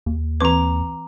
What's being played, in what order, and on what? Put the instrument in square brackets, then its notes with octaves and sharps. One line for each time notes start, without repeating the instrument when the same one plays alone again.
[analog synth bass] D#2
[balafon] E3 C4 B4 [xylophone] A#5 D6